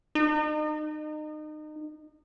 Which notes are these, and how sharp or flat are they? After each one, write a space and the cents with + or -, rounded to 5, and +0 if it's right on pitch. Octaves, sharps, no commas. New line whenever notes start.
D#4 -30